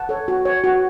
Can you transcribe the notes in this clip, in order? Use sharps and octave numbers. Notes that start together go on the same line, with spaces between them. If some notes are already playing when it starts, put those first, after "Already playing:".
Already playing: F#5 A5
A4 C#5
F#4
C#5
F#4